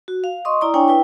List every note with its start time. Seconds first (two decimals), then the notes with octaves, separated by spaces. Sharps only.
0.08 F#4
0.24 F5
0.45 D#5 C6 C#6 D#6
0.61 E4 D5 A#5 D#6
0.74 D4 E4 C#5 G5 G#5 C#6
0.88 E4 B4 G5